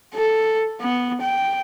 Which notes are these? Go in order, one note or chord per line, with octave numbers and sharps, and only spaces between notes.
A4
B3
G5